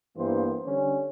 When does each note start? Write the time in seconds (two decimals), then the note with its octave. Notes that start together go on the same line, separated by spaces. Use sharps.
0.17 G2 E3 A#3 B3 C5
0.64 D3 G3 C#4